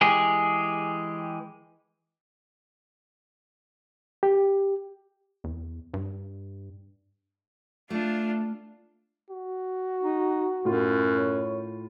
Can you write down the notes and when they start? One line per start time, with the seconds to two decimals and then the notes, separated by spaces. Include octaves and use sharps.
0.01 E3 G#3 G4 G#4
4.23 G4
5.44 E2
5.94 G2
7.90 A3 D4 F4
9.30 F#4
10.03 D#4
10.65 F#2 A2 F4
11.16 C#5